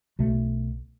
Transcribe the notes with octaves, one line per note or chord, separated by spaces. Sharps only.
B1 B2 A3